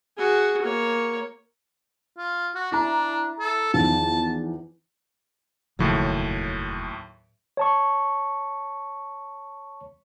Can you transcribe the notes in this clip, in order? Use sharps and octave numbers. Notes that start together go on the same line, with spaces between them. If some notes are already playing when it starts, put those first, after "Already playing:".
F#4 G#4
A#3 C#5
F4
F#4
D4 E4 A#5
A4
E2 D#3 F3 A5
F1 D#2 A2 C#3 F3 F#3
C#5 A5 C#6